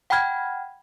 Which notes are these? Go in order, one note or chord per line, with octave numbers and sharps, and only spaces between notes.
F#5 G5 A5 B5 F6 G#6